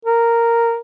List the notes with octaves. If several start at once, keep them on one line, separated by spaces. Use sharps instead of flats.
A#4